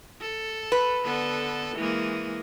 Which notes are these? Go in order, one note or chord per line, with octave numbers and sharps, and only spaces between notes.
A4
B4
D3 B3 A4
E3 G#3 A#3